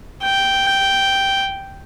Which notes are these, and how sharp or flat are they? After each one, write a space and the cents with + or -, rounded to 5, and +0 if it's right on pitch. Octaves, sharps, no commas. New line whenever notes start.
G5 -5